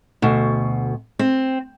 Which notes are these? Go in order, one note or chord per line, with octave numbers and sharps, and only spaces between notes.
D2 B2
C4